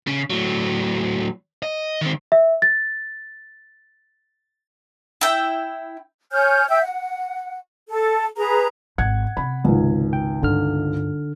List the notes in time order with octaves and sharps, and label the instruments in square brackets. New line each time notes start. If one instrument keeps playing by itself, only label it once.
[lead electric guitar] C#3
A2 F#3
D#5
D#3 C4
[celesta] E5
A6
[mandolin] E4 G5
[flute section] C#5 G#5 F6 G6
E5 G5 E6 G6
F#5
A4 A5
G#4 B4 A#5
[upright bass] G#1 [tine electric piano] F#5 [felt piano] G#6
[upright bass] C3 [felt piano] B5
[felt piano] G#1 C#2
[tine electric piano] G5
[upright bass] G2 [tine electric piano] D3 F6